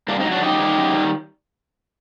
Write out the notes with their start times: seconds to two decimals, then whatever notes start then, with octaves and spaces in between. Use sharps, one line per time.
0.08 G2 A#3 D4
0.20 C4 D#4
0.25 F#3
0.31 D4 F#4
0.42 F#2 D#4 G4
0.59 D#3 G3
0.76 F#2
0.93 D#3 G3